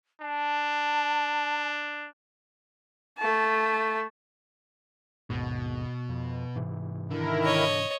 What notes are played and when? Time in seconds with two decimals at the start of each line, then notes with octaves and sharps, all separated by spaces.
0.21 D4 A5
3.18 A3 A5
5.30 G#1 D#2 G#2 B2
6.09 F2
6.56 G#2 C3 E3
7.11 D3 D#3 E4 A#4
7.45 C#5 D#5